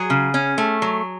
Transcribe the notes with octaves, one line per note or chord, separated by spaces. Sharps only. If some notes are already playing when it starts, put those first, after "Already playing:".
Already playing: F#3 G#4
C#3
C#4
A3
F#3